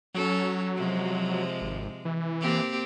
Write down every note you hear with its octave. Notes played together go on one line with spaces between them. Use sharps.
F#3 C#4 A4
C3 F3 G#3
G#1
E3
A#3 C4 G4